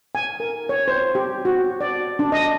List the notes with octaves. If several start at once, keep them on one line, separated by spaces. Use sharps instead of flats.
G#5
A#4
C#5
C5
G4
F#4
D5
D4
D#5